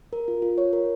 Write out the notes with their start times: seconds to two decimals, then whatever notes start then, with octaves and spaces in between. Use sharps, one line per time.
0.13 A#4
0.28 F4
0.42 F4
0.58 C#5
0.73 A#4